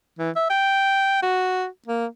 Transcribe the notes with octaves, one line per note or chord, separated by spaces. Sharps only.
E3
E5
G5
F#4
A#3